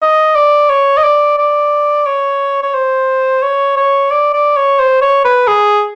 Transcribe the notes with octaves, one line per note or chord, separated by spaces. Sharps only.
D#5
D5
C#5
D#5
D5
D5
C#5
C#5
C5
C#5
C#5
D5
D5
C#5
C5
C#5
B4
G#4